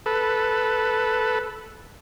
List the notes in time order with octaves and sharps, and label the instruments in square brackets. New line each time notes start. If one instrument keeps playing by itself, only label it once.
[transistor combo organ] A4 B4